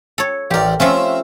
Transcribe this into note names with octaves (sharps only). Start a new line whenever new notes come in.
A4 C#5
A1 G4 A#4 D5
F3 A3 C4 C#4 E5 F5